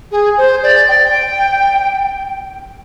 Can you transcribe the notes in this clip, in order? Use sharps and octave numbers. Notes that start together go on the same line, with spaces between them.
G#4
C5
D5
G5